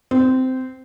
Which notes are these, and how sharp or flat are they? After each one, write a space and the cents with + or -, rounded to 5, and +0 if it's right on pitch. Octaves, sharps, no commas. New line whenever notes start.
C4 -15